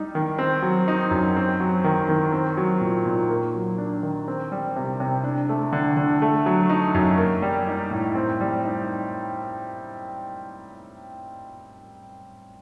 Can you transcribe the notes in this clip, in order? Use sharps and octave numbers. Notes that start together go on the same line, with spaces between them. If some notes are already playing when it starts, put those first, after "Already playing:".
Already playing: G3 D#4
D#3
C4
F#3
D#4
F#2
C4
F#3
D#3
D#3
C4
F#3
A#2
A#2
A#3
F#3
D4
D#3
C4
G3
C3
C3
D4
A3
D3
D3
A3
F#3
D#4
F#2
A#3
G3
D#4
A2
C4
G3
D#4